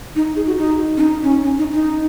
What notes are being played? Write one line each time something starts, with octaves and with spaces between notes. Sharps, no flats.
D#4
G#4
F#4
D#4
C#4
D#4
C#4
C#4
D#4
D#4